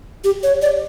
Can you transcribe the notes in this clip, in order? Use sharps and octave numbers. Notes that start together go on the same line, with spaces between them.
G4
C#5
D5